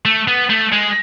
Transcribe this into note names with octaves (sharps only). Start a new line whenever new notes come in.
A3
B3
A3
G#3